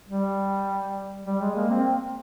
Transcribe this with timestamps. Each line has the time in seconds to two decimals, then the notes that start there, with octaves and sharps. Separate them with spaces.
0.09 G3
1.27 G3
1.41 G#3
1.56 A#3
1.70 C4